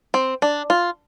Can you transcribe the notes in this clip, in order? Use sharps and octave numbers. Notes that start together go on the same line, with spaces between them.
C4
D4
F4